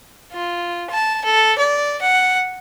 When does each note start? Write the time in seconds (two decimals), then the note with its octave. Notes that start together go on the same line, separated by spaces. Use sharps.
0.32 F4
0.91 A5
1.24 A4
1.59 D5
2.02 F#5